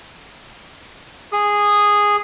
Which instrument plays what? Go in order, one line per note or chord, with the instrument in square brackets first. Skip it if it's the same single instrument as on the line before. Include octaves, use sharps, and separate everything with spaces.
[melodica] G#4 D#6